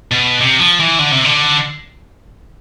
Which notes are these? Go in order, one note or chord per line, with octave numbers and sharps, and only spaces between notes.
B2
C3
F3
E3
D3
C3
D3